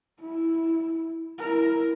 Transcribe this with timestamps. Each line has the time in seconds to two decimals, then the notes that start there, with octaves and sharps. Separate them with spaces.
0.20 E4
1.39 E4 A#4